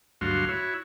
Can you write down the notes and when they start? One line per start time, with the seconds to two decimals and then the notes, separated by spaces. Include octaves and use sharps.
0.21 D2 G2 F#3 F#4 F5 C6
0.49 E4 F#4 C#5